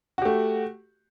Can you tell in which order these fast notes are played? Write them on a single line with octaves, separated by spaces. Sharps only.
F#4 G4 A3